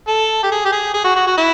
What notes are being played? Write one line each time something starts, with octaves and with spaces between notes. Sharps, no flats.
A4
G4
G#4
G4
G#4
G#4
F#4
F#4
F#4
E4